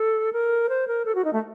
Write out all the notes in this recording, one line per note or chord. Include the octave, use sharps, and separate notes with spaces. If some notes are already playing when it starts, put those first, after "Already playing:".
Already playing: A4
A#4
C5
A#4
A4
F#4
D#4
A3